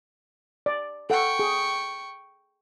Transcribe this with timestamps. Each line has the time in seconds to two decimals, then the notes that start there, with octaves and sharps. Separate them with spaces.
0.66 D5
1.10 A4 F#5 G5 C#6
1.39 G#4